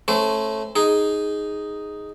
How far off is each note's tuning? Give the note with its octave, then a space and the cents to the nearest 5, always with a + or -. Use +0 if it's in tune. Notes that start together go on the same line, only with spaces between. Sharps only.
A3 -5 C#4 -30 C5 -35
D#4 +0 G#4 +0